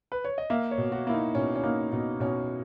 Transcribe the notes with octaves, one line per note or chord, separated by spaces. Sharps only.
B4
C#5
D#5
A#3 E5
C#5
B2
F#4
A#3 E4
D#4
B2 C#4
C#4
A#3 D#4
B2 D#4
B2 C#4